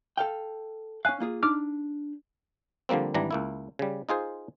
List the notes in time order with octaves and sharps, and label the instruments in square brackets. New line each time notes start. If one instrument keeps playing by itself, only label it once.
[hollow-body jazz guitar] A4 F5 G5
[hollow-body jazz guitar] C#4 F5 [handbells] G#5 F#6
[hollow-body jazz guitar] A#3 F4 G#4
[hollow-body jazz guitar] D4 [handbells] D#4 D6 F6
[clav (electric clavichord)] D3 F3 G3 A#3 C4
G#1 E3 G3 D4 A#5
C#2 A#3 E4
C#3 G3
D#4 F4 G#4 C5